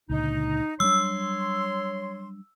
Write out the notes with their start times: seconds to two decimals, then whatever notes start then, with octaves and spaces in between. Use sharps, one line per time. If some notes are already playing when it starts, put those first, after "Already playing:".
0.10 C#2 A#2 D3 D#4
0.80 F#3 G3 D4 C#5 C6 E6